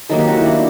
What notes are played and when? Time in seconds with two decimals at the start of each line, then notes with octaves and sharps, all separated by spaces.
0.09 D#3 F#3 A#3 A4
0.19 G4
0.28 F#4
0.37 E4
0.46 D4